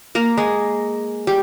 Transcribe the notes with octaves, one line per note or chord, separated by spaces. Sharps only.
A#3 A#4
G#3 G#4
G3 G4